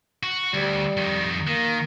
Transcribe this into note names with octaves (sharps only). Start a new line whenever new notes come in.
F#4
D2 G3
F2 D#3
D#3 A#3